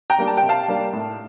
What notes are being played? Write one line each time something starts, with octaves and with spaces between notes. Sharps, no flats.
G5 A#5
G3 A#3 D4
A5
G5
C3
F5 A5
G3 A#3 D4
A2